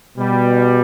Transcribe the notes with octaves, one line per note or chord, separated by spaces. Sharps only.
B2 G3